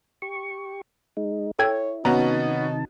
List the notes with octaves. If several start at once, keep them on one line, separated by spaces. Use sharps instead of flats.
G4 C#6
G#3 D#4
E4 A4 C#5 G5 G#6
C3 D#3 B3 C#4 D#4 F#4 A5 A#5